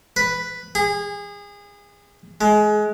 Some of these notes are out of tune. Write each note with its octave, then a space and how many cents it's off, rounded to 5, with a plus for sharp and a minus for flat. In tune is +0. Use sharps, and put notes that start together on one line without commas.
B4 +0
G#4 -30
G#3 +25